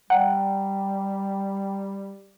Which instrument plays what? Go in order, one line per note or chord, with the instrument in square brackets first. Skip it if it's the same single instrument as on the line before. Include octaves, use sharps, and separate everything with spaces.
[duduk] G3 [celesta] D5 G5 A#5 [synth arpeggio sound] F#5